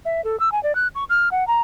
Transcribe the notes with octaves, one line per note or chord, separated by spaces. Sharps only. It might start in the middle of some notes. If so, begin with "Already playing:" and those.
E5
A4
E6
G#5
D5
F#6
C#6
F6
F#5
A#5